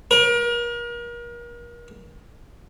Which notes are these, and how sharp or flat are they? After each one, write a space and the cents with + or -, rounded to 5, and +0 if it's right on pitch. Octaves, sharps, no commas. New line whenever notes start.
A#4 +35